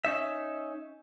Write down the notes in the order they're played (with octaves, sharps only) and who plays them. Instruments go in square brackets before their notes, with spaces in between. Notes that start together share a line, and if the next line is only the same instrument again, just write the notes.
[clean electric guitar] C#4 D#4 E5